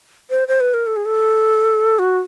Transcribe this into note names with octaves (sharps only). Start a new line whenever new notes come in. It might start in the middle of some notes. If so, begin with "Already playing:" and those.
C5
C5
B4
A#4
A4
G#4
A4
F#4